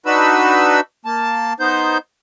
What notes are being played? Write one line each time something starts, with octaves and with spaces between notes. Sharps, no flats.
D4 D#4 F#4 B4 B5 E6
A#3 A5
B3 D#4 C5 G6